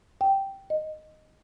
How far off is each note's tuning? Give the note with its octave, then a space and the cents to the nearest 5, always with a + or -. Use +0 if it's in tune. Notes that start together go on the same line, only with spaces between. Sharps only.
G5 -5
D#5 -5